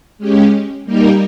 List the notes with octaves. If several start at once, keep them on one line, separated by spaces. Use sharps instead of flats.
G#3 C#4 G4
G3 A#3 D#4 G4 A#4